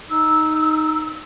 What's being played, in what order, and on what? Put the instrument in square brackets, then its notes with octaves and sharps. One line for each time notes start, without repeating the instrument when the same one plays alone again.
[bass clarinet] D#4 [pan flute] E6